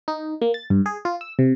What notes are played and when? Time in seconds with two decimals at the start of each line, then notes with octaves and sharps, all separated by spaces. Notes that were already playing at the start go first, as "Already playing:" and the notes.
0.08 D#4
0.42 A#3
0.54 A6
0.70 G2
0.86 G#4
1.05 F4
1.21 E6
1.39 C3